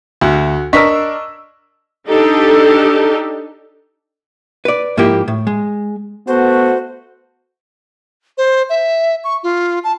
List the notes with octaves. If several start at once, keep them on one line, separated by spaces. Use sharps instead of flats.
D2 F#4
D4 A#4 D#5 C#6 E6 B6
D4 D#4 G4 A4
B4 D5
G#2 F3 A#3 E4 G4
A2
G#3
A3 B3 F#4 C5
C5
E5
C#6
F4
A5